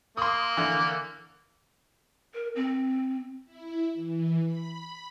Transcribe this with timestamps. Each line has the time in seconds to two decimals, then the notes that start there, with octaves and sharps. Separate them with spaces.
0.17 A#3 C6 D#6
0.57 D3 E3
2.35 A#4
2.56 C4
3.45 E4
3.94 E3
4.45 B5